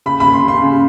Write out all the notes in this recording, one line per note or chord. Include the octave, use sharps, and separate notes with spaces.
C#3 B5
D#2 B5
C6
C#3 C6
C#3